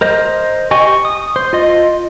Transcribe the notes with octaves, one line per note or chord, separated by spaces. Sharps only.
A#4 C5 D#5
G4 D#5 G#5 C#6
C#6
D#6
C5
F4 D#5